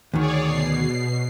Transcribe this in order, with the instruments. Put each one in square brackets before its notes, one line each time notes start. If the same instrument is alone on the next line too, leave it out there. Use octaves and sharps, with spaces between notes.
[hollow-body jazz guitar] D2 D#3 [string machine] G#4 C#5 D5
[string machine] B2 C7